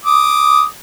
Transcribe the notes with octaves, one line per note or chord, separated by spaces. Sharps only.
D6 D#6